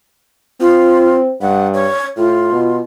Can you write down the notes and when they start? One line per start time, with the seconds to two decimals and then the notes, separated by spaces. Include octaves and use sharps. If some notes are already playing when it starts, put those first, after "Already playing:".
0.60 C4 F4
1.41 G2 F#5
1.74 C#5
2.17 A2 F4
2.52 B2